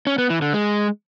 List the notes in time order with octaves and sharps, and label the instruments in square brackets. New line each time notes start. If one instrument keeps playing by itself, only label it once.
[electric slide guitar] C#4
B3
E3
D3
G#3